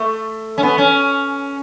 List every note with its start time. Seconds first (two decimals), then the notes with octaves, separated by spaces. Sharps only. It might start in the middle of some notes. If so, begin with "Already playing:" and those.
Already playing: A3
0.58 C#4
0.63 B3
0.78 C#4